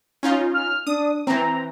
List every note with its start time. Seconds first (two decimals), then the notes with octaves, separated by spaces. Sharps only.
0.23 C#4 D#4 F4
0.54 F6
0.87 D4 D#6
1.27 E3 C4 A#5